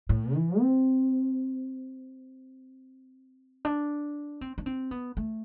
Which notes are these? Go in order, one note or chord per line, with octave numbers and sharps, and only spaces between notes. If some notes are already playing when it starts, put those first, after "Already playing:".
A2
E3
C4
D4
C4
D4
C4
B3
A3